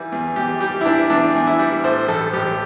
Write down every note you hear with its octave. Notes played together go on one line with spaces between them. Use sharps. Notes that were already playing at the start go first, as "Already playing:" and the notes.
Already playing: E3 G3
E2
E2 G4
G3 G4
E4
E3 D4
E2 D4
E2
E4
G3
A2 C5
A1 A4
A1 G4